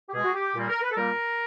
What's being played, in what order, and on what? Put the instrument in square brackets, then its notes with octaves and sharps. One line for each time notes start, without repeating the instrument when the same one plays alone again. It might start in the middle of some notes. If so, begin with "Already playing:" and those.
[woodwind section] G4
B2 G#3 G#4
F#4
G4
A#2 G3 A#3
A#4
B4
A4
A#2 G3 A#3 A#4